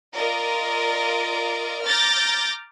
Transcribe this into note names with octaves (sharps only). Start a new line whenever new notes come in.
F4 A#4 D5 D#5
A#5 D6 F6 G6 A6 A#6